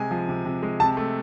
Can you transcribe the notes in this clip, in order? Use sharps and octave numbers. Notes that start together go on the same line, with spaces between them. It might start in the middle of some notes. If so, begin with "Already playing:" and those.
Already playing: C3 G#3 G#5
F3
C3
C3
G#3
C3 A5
A3